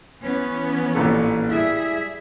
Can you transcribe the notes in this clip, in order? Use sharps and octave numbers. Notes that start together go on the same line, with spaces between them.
E3 B3 C#4
A1 A#2 A4
G3 E4 G#4 E5